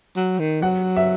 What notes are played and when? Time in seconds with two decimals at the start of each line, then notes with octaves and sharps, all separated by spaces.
0.17 F#3
0.39 D#3
0.62 F#3 F#5
0.96 E5